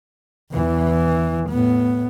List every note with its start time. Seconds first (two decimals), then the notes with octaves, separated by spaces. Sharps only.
0.52 E2 E3
1.50 A2 B3